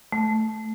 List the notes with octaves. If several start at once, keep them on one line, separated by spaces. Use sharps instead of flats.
A3